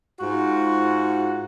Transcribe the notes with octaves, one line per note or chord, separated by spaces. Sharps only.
G#2 F4 F#4